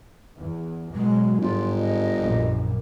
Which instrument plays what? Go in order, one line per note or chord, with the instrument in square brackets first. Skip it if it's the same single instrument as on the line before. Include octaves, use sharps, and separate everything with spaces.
[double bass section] E2
[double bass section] B2 F#3 [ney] G#3
[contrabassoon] G1 [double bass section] G#2 [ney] F4
[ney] D#5
[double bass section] A#1 F#2 A#2